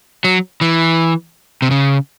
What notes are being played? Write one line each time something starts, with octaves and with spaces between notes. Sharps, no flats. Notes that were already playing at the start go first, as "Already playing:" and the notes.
F#3
E3
C3
C#3